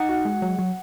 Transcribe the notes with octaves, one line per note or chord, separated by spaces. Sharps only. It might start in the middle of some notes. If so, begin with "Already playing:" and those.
Already playing: D#4 F#5
F#4
G#3
F#3
F#3